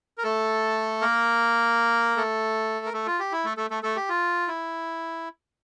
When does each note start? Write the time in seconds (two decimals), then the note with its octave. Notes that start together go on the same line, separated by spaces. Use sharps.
0.18 A#4
0.23 A3 A4
1.01 A#3 A#4
2.17 A3 A4
2.86 A#4
2.93 A3 A4
3.07 F4
3.19 G4
3.32 E4
3.45 A3 A4
3.57 A3 A4
3.70 A3 A4
3.83 A3 A4
3.96 G4
4.09 F4
4.48 E4